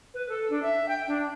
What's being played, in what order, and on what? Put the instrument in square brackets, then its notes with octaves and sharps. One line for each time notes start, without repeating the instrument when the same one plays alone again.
[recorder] B4
A4
D4
E5
G5
D4